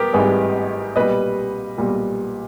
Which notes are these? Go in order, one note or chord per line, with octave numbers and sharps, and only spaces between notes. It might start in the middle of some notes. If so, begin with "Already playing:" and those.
Already playing: B3 G4 A#4
G#1 G#2 E3 G3 G#4 B4
B1 A#2 G3 B4 D#5
B1 A#2 G3